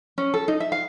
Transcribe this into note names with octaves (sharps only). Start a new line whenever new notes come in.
C#4
A4
D#4
E5
F5